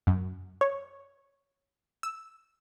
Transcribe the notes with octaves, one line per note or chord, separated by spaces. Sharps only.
F#2
C#5
E6